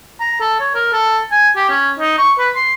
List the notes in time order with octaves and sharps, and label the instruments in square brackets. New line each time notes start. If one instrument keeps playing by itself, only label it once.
[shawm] A#5
A4
C#5
A#4
A4
G#5
G4
C#4
D#4
C#6
B4
C6